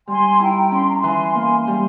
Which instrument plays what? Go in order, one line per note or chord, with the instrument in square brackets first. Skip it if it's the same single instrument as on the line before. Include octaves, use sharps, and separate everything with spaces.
[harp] G3 [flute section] G#5 C6
[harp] E4 [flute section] G5 A#5
[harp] C#4 [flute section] C6
[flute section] A#5
G#5 C6
[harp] E3
[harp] A#3 [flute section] G#5 C6
[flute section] G#5 C6
[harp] G3